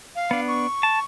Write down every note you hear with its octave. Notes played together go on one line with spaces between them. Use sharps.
F5
B3 D4
C#6
A5